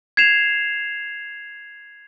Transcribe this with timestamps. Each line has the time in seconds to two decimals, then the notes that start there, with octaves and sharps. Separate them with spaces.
0.17 G#6 C7 E7 F7